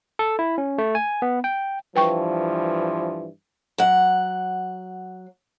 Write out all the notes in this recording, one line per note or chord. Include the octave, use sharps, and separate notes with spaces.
A4
E4
C#4
A3
G#5
B3
G5
G2 E3 F3 B4 G5 C#6
F#3 F#5